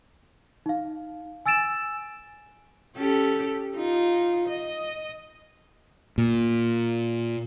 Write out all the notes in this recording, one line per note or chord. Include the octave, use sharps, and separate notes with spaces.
D#4 F5
G#5 E6 A6 D7 E7
C#4 G4 A4
D#4 F4
D#5
A#2